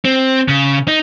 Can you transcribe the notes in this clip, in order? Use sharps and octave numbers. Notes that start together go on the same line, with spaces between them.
C4
C#3
D#4